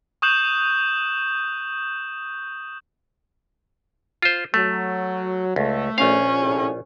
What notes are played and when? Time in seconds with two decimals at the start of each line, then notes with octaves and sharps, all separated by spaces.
0.22 C#6 D#6 F#6 G6 E7 F#7
4.22 F4 C5
4.54 F#3 A3
5.56 C#2 A3
5.98 A#1 C#4 F5
6.41 A2 C3